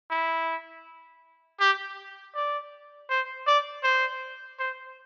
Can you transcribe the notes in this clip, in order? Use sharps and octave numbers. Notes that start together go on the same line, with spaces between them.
E4
G4
D5
C5
D5
C5
C5